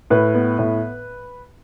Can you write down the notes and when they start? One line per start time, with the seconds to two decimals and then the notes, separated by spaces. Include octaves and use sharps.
0.10 A2 B4
0.35 B3
0.59 A2